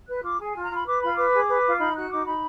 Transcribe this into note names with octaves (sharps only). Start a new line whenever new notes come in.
B4 F#6
F4 D6
G#4 G#5
F4 G#5
A#5
F4 B5
B4 D6
F4 B5
B4 D6
G#4
B4
F4
D#4 B5
F#4 F#6
D#4 D6
D#4 B5